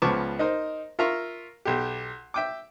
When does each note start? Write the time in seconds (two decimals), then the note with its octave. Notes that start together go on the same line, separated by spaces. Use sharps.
0.02 C#2 F3 B3 A5 C#6 D6
0.39 D#4 A#4 C5
0.99 F4 A#4 E5 A#5 C#6
1.65 B1 G4
2.34 E5 G5 D6